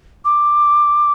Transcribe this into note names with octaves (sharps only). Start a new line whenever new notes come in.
D6